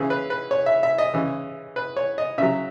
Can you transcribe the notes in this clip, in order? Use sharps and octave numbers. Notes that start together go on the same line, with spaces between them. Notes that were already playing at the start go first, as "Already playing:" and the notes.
Already playing: C#3 E3 G#4
B4
B4
C#5
E5
E5
D#5
C#3 E3
B4
C#5
D#5
C#3 F#3 E5